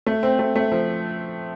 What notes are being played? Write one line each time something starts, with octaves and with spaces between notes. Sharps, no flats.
A3
C4
A3
A3
F3